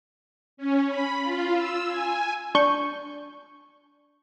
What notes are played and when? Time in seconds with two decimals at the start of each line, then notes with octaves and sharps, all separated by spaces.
0.57 C#4
0.88 B5
1.21 F4
1.52 E6
1.86 G#5
2.55 D4 C#6 G6